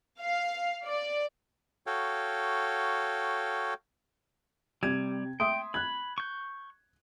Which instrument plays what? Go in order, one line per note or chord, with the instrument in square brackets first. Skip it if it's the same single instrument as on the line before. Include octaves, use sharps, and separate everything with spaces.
[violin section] F5
D5
[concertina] F#4 A4 C#5 F5 G5
[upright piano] C3 G#6 [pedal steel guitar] G3
[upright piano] E5 C6 D#6 [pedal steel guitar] G5
[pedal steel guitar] B5 [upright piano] F#6 G#6
[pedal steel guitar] C#6 G6